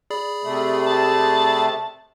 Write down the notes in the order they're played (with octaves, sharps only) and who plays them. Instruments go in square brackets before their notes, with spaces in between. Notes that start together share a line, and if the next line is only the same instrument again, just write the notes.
[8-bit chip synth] G#4 D5 B5
[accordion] C3 A3
[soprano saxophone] A5